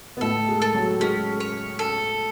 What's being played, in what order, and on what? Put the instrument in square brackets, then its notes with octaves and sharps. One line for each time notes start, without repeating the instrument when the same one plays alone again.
[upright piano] B3
[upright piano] A2 A3 [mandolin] A4
[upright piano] G#3
[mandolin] A4
[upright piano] F#3
[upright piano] G#3 [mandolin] C#4
[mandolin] C#5
A4